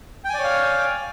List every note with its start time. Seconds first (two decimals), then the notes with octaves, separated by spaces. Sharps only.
0.25 G5
0.29 G#5
0.34 D5
0.39 C#5
0.44 F5